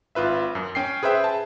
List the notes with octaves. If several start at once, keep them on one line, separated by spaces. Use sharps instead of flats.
G#1 F4 B4 E5
F#2
C#4 G5 C7
G#4 B4 C5 E5 G5
A5